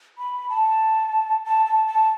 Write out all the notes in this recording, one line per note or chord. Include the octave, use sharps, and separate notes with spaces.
B5
A5
A5
A5
A5